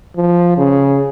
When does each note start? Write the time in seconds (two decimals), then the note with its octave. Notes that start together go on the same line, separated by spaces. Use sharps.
0.16 F3
0.57 C#3